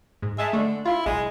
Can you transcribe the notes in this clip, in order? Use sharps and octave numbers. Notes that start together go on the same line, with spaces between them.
G#2
G#3 E5 A5
D3 A3
E4 F4
B1 G#3